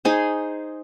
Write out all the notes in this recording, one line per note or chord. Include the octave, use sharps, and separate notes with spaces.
D#4 G#4 C5